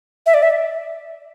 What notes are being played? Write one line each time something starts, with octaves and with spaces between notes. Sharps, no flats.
E5
D5
E5